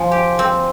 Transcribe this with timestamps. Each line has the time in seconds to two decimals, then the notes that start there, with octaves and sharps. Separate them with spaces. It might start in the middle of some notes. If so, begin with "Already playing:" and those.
Already playing: F3 G#5 C6
0.11 G4
0.39 C4